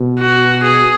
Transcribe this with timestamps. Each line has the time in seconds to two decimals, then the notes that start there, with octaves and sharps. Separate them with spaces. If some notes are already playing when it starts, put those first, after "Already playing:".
Already playing: B2
0.20 F#4
0.64 G#4